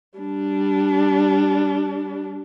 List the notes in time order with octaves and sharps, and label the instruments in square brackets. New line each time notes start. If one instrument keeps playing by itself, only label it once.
[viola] G3 D4